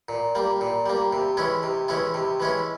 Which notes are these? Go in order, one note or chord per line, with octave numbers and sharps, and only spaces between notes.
A#2
G3 A#3
A#2
G3 A#3
C3
E3 G#3 C#4 E4
C3
E3 G#3 C#4 E4
C3
E3 G#3 C#4 E4